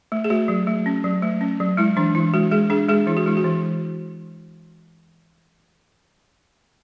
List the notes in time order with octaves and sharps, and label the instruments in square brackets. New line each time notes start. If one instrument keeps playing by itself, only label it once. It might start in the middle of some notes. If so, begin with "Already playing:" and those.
[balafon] A3
G#4
A3 F#4
F#3
A3
C#4
F#3
A3
C#4
F#3
G#3 E4
E3 D4
E3 E4
G#3 F#4
G#3 G#4
D4 G#4
G#3 G#4
E3 E4
F#4
G#3 E4
F#4
E3